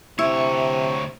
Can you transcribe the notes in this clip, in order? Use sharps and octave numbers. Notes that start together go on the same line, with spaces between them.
D2 C3 E4 C#5